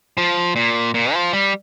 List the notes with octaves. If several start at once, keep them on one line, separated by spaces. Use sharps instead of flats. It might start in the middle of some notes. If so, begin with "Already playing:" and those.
F3
A#2
A#2
F3
G3